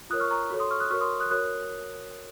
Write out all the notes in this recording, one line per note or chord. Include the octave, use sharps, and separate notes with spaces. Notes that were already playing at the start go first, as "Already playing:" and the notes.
F4 A#4 C#5 D#6 F#6
C#6 F6
A#5 C#6
F#4 A4 C#5
C6 D#6
C#6 F6
D#6 F#6
F#4 A#4 C#5 C#6 F6
C6 D#6
D#6 F#6
F#4 A#4 C#5 D#6 F#6